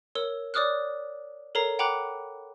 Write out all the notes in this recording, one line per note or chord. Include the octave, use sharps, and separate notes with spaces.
A#4 C#5 E6 G7
C#5 D5 D6 D#6 F6 F#6
A4 A#4 C#5 A#5 C7
F#5 G5 A#5 B5 D6 F#6